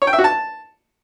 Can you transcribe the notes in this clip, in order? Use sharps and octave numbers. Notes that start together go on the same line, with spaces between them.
C#5
G5
E5
F#4
A5